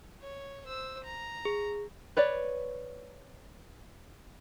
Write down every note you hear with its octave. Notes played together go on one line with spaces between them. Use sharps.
C#5
C5 E6
A#5
G#4
B4 C#5 D5